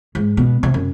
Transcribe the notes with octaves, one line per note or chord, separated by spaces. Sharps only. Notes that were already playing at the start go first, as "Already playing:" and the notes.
G#2
B2
C3
F#2